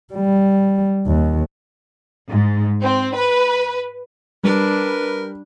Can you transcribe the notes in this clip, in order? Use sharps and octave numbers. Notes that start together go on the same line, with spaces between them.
G3
D#2
G#2
C4
B4
G3 D4 A#4 B4